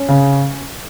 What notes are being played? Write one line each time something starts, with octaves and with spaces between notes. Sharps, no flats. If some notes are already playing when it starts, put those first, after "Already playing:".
Already playing: C#4
C#3